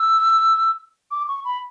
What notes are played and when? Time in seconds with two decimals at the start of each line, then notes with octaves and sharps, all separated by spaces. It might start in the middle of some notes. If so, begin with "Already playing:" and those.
Already playing: E6
1.11 D6
1.28 C#6
1.45 B5